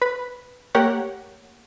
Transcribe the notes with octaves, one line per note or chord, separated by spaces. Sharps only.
B4 B5
A3 A#3 G4 A#4 C#5 F#5